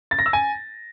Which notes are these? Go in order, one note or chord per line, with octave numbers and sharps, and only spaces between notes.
A6
A#6
E6
G#5